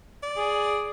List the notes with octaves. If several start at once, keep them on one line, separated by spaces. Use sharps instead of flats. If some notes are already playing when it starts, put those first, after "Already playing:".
D5
G#4